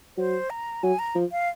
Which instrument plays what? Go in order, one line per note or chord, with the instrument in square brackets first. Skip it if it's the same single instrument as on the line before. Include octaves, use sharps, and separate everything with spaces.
[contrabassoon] F#3 [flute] C5
[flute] A#5
[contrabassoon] F#3 [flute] G#5
[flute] A#5
[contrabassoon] F3
[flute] F5